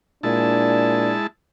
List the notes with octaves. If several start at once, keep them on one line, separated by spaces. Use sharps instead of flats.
A#2 G#3 D4 E4 A5